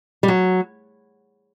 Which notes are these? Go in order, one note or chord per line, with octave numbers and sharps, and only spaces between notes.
G3
F#3